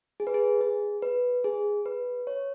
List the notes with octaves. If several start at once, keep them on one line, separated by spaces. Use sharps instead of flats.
G#4
B4
G#4
G#4
B4
G#4
B4
C#5